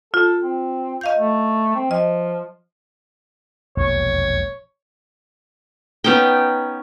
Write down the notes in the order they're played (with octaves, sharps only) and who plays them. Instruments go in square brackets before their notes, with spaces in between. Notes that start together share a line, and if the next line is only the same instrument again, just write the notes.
[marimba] F4 [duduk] A4
[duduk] C4
[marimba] D#5 F5 G6
[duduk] A3
C4
[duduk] F3 [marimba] D#5
[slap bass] E1 A#1 D#2 [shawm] C#5
[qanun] B3 C#4 D#4 G5